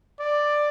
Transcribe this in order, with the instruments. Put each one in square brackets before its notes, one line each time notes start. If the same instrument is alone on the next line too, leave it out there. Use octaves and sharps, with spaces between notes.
[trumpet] D5